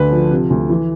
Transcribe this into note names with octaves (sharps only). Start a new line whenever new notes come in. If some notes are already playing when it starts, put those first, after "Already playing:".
Already playing: D2 D3 B4
F3
C3
D2
E3